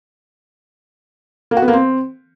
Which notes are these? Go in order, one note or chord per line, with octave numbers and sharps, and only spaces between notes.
A#3
F#4
B3
A#3
C4